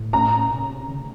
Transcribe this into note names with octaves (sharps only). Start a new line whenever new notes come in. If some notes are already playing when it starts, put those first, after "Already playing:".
Already playing: A2
A#5
A#2
C3
D#3
C#3